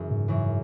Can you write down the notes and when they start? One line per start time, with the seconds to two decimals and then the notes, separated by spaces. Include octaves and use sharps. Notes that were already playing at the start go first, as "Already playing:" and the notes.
Already playing: F#2 C#3 E3
0.11 G#2
0.28 F#2 C#3 E3